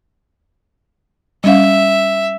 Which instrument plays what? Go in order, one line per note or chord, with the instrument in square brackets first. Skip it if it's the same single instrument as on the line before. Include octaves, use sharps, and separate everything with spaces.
[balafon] G3 C#4 F5 [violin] E5